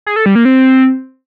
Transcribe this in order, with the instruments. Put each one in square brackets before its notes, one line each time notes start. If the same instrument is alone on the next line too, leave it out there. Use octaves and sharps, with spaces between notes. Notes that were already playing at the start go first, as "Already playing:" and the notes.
[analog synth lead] G#4
A4
G3
A#3
C4